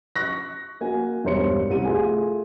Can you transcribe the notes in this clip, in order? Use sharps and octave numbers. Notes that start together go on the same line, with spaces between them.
C#6 F#6 A#6
A#3 F#4 G#5
E1 G2 A#4 C5 C#5 C#7
C2 D#7
A3 F4 G#4 A4 G#5